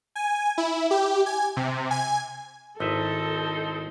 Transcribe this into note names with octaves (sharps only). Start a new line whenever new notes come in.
G#5
E4
G4
G#5
C3
G#5
G#1 C4 D#4 E4 A4 B4 E5 E6